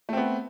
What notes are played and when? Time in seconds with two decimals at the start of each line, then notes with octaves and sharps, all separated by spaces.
0.09 A3
0.13 C4
0.17 B3